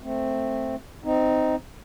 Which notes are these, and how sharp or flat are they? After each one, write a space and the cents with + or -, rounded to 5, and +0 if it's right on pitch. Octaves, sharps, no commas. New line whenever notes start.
A3 +0 C4 +0
C4 -15 D#4 +0